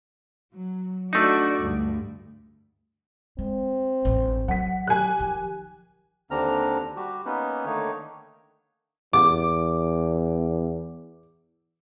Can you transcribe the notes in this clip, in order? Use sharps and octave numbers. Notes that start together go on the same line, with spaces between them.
F#3
A3 D4 D#4 F#4 D5
D2 G2
G#3 C4
A1 G2
F#3 F#5 B6
G4 G#5 F#6
D#3 F3
D#2 D3 C4 D4 A#5 F6
G3 F#4 G4
A#3 B3 C#4 D#4 B4
D3 D#3 A3 A#3 D#4 C#5
E2 D6